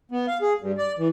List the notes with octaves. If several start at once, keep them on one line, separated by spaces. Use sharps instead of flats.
B3
F5
G#4
G2
D5
E3